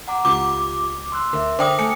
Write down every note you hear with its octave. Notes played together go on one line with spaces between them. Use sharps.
F#5 A#5 D6
C#2 F4 G4 D6
C6 E6 F#6
D2 A#4 E5
D3 C5 G5 D6 D#6 A#6
A3 G#5 C#7